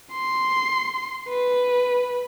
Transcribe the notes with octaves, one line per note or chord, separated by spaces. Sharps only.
C6
B4